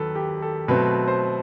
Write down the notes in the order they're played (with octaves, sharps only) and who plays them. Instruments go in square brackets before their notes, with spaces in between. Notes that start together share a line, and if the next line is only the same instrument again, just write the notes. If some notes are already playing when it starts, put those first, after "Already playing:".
Already playing: [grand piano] D#2 F#3 A4 B4
G4
A4
B2 F#3 A3 C4 B4
C5